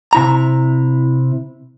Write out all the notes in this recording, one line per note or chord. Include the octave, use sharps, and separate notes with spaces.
C3 E4 A#5